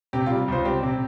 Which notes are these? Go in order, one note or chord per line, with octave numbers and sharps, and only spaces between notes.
C3 G4
G3 F4
C#2 C5
C4 G4
C3